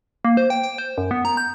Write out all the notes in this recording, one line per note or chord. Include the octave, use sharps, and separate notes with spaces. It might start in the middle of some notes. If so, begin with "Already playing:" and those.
A#3
C5
G5
G5
C5
F#2
B3
A#5
G6